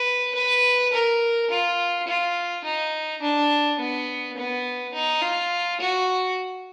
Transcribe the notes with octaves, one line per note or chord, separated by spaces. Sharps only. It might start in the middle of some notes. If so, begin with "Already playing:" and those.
Already playing: B4
B4
A#4
F4
F4
D#4
D4
B3
B3
D#4
F4
F#4